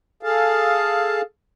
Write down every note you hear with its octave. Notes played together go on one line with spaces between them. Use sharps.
G#4 A4 F5 A5